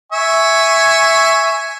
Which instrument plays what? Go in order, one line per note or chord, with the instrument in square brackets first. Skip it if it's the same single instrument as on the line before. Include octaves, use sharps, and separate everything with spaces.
[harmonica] E5 G#5 C#6